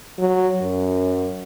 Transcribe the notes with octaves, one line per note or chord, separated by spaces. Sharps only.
F#3
F#2